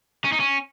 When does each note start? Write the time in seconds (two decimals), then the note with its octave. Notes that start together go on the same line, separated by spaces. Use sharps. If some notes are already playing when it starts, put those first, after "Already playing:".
0.25 C#4
0.32 D#4
0.40 C#4